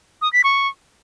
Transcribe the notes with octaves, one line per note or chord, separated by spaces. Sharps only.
D#6
B6
C#6